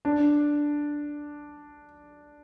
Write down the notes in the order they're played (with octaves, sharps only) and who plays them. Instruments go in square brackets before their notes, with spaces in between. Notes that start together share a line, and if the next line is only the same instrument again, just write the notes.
[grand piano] D4